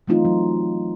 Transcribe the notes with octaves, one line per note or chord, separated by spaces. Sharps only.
E3 F#3 A3 C4 D#4 F4
F#3